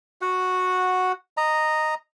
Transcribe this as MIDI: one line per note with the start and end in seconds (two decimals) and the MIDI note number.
0.21 1.12 66
0.21 1.12 78
1.37 1.95 75
1.37 1.95 82